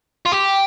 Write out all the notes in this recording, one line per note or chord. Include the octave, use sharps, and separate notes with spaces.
F4
G4